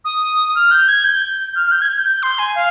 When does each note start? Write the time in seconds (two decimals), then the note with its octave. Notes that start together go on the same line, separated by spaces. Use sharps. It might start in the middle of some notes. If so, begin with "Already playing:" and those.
0.05 D#6
0.55 F6
0.71 G6
0.88 G#6
1.05 G6
1.55 F6
1.67 F6
1.72 G6
1.82 G#6
1.88 G6
2.05 G6
2.23 C6
2.39 G#5
2.55 F5